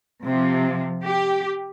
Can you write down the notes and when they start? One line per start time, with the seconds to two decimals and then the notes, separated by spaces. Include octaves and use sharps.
0.23 C3
0.28 F3
1.03 G4